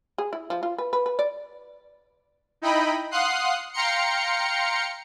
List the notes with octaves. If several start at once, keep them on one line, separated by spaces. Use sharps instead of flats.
G#4
E4
F3
F4
B4
B4
B4
D5
D#4 E4 D#5 G5 B5
F5 F#5 C6 D#6 F#6 C7
F5 G5 A#5 C6 C#7